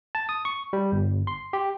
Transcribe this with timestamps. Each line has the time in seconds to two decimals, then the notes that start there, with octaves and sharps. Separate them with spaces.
0.15 A5
0.29 D#6
0.45 C#6
0.73 G3
0.92 G1
1.27 C6
1.53 G4